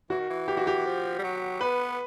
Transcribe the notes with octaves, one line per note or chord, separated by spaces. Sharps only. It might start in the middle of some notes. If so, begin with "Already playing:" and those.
E3 F#4
D#3
E3
G4
F#4
G4
F3
G3
F#3
B3 B4